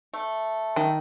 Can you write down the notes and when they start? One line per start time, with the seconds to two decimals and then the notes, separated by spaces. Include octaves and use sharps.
0.14 A3
0.76 D#3